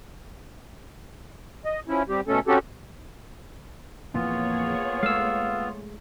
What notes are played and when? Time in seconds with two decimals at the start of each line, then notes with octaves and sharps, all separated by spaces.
1.65 D#5
1.88 F3 C#4 E4
2.09 G3 C4 G4
2.28 B2 A3 C#4 A4
2.47 C4 C#4 F#4 G4 A4
4.14 F2 A#2 E3 A#3 B3 F4 G#4 C#5
5.03 G#3 A3 F5 E6